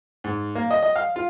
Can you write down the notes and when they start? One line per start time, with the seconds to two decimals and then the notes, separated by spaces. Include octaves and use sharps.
0.24 G#2
0.55 A#3
0.71 D#5
0.83 D#5
0.96 F5
1.16 F4